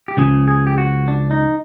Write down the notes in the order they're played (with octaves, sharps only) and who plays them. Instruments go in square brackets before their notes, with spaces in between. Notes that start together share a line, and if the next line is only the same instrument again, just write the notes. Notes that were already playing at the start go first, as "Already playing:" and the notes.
[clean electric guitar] G4
C#2 C#3 F3 G#4
G#4
G4
F#4
D4
D#4